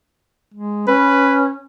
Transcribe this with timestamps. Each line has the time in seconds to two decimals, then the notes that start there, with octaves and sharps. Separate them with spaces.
0.54 G#3
0.88 C#4 B4